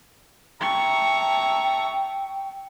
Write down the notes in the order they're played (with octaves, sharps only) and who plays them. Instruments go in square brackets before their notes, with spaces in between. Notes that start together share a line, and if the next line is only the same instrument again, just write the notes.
[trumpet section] E5 A5 A#5 [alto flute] G5 [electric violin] C#6